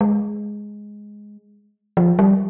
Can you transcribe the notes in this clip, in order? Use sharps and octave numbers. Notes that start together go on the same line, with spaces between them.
G#3
F3
G3